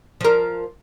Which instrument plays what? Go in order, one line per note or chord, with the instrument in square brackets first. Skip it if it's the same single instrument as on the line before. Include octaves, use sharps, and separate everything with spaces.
[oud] F3 A#4